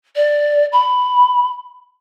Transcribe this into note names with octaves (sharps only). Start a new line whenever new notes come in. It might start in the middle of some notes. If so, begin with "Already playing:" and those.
D5
B5